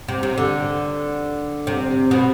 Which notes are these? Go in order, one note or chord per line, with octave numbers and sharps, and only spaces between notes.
C3
C3
D3
C3
B2